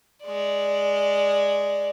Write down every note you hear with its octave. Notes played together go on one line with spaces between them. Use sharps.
G#3 D5